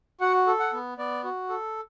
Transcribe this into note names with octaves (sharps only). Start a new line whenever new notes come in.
F#4 F#5
A4
F#5
B3
B3 D5
F#4
A4